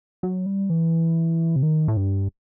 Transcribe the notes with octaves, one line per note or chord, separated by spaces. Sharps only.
F#3
G3
E3
C3
D#3
A2
G2